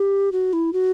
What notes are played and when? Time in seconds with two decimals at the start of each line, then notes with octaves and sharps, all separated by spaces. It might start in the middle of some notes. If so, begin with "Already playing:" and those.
Already playing: G4
0.32 F#4
0.53 E4
0.73 F#4